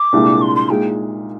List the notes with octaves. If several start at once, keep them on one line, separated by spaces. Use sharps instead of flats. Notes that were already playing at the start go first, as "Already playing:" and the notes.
Already playing: D6
C2 A#2 G#3 D4
C6
C6
A#2 G#3 D#4 G#4 G5